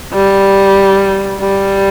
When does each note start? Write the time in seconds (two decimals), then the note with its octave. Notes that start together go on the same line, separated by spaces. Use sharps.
0.14 G3
1.40 G3